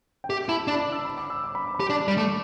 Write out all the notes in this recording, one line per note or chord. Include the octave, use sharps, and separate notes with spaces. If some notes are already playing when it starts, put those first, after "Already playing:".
G5
G4 E5
E4 A5
D4
B5
D6
E6
B5
D6
E6
D6
B5
D6
B5
G4 D6
D4
G3
A3 D6